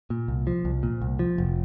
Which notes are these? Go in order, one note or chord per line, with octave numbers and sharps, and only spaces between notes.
A#2
C2
F3
C2
A#2
C2
F3
F1